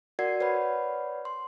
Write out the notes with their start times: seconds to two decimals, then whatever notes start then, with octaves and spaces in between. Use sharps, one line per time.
0.19 F#4 A#4 D5 F#5 G#6 C7
0.40 B4 C#5 D5 F#5 B5
1.25 C6